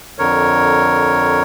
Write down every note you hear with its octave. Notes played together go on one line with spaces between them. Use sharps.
F2 D3 A#4 C#5